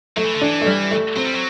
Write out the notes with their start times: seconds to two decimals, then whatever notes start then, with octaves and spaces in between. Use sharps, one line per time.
0.17 F#3 A3
0.26 E3
0.35 D3
0.41 E3 D4
0.61 A3
0.66 G3
0.91 A3
1.16 F#3 C4
1.25 G3
1.34 F#3